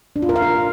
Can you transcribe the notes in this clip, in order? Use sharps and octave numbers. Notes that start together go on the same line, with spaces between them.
D4
F4
A#4
F5
A#4